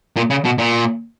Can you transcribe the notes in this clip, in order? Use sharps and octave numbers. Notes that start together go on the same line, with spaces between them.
A#2
C#3
B2
A#2